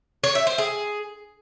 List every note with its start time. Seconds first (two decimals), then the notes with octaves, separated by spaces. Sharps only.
0.24 C#5
0.35 E5
0.47 C5
0.58 G#4